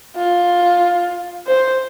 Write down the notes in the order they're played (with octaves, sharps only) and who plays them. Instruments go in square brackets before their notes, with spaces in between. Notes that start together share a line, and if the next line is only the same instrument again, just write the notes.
[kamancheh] F4
C5